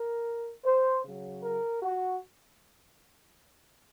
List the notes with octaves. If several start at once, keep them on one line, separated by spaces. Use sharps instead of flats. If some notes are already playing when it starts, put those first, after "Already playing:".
Already playing: A#4
C5
C#3 F#3
A#4
F#4